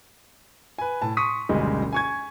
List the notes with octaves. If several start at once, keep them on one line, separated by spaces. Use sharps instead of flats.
B4 G#5
A2 A5
C6 C#6 D#6 B6 D#7
F#1 D2 B2 G3 G#3 D#5
G#5 C#6 G#6